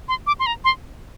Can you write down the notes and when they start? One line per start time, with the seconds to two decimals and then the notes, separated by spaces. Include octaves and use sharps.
0.08 C6
0.27 D6
0.40 C6
0.46 A#5
0.64 C6